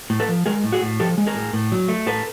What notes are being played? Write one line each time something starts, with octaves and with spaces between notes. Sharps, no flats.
A2
A4 B4
F3
G#3 G#4 A#4
A2
F#4 G#4
A2
F3 G4 A4
G#3
G#4 A#4
A2
A2
F#3
A3
A2 A4 B4